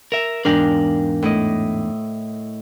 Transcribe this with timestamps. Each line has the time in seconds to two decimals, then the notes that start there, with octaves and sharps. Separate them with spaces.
0.12 A#4 E5
0.45 E2 G#2 D4 A#4 F5 G5
1.22 A2 E4 D#5